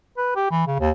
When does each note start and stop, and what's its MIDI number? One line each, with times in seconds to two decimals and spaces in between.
0.17 0.32 71
0.36 0.50 67
0.51 0.65 52
0.67 0.75 49
0.80 0.91 39